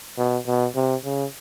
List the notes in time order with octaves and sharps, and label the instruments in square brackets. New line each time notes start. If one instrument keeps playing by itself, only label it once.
[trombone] B2
B2
C3
C#3